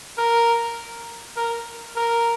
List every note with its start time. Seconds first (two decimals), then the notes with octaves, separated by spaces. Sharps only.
0.18 A#4
1.37 A#4
1.96 A#4